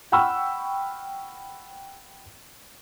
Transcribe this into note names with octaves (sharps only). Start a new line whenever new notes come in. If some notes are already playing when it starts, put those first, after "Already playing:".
F#5 G5 B5 C#6 E6 F6